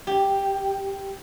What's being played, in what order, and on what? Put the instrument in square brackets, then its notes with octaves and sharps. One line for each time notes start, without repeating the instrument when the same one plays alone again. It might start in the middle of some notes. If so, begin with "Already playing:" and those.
[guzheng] G4